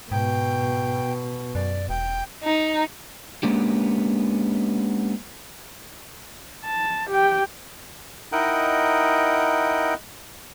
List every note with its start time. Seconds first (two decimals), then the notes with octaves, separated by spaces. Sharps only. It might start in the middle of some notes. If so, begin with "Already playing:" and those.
0.12 G#2 B2 G5
1.55 F#2 D5
1.89 E1 G5
2.45 D#4
3.43 G#3 A#3 B3 C#4 D4 G4
6.65 A5
7.09 G4 G5
8.32 D#4 E4 A#4 D#5 F#5 G5